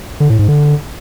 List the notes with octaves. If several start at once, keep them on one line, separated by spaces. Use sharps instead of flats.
D3
A2
G#2
D3